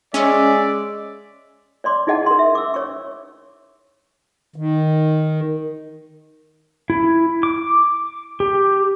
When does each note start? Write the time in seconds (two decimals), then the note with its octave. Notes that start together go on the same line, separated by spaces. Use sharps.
0.14 G#3 C#4 D5 E5
1.84 C#5 D5 C6 D6
2.07 D#4 E4 G#4 D#5 F#5 A5
2.26 A#4 C6
2.39 E5
2.55 D6 E6
2.74 C#5 C#6
4.56 D#3
6.90 E4
7.43 D6
8.40 G4